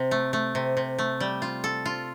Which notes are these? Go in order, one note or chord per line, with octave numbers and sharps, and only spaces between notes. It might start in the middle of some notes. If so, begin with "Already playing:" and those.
Already playing: C3
A3
A3
C3
C3
A3
G3
F4
A4
F4